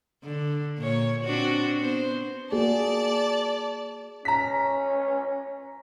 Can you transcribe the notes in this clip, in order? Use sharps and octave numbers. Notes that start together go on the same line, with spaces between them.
D3
A#2 C#5
C4 D4 F#4
B3 C5
A#3 F#4 G#4 D5 A5
C#4 A#5 B6